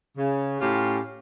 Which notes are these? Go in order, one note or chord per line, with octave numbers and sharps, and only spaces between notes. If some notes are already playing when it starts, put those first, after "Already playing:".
C#3
A2 C#4 F4 G4